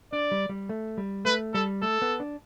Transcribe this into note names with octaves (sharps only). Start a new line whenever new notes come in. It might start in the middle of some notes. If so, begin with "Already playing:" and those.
D4 D5
G3
G3
A3
G3
A3 B4
G3 A4
A3 A4
B3
D4